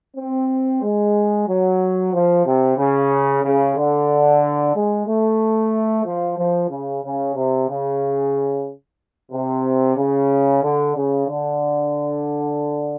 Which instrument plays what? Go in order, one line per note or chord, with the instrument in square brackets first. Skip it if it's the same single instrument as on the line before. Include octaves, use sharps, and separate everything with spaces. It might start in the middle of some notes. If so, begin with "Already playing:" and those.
[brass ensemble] C4
G#3
F#3
F3
C3
C#3
C#3
D3
G#3
A3
F3
F3
C#3
C#3
C3
C#3
C3
C#3
D3
C#3
D3